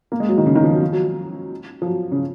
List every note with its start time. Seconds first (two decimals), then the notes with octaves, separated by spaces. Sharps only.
0.12 A#3
0.20 G#3
0.29 F#3
0.38 D#3
0.46 C#3
0.55 D#3
0.64 F3
0.72 F#3
0.81 F3
0.93 F#3
1.82 F3
1.86 F#3
2.12 C#3